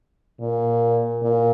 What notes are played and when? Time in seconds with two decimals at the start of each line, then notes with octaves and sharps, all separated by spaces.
0.40 A#2
1.23 A#2